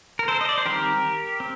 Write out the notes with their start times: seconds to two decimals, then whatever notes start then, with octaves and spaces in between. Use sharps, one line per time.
0.19 A#4
0.28 A4 C5
0.41 D#5
0.49 D5
0.58 C5
0.66 D#3 G3 C4 G4 A#4
1.40 C4